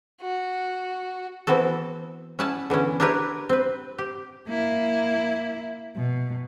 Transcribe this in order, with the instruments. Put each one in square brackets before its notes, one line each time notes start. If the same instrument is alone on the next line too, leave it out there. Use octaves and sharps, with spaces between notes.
[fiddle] F#4
[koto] E3 B3 C4 F#4 A4
C#4 E4 F#5 G#5 A5
D3 E3 B3 C#4
D4 E4 G4 A#4 B4 C#5
C4 B4
G4
[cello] A#3 E4
B2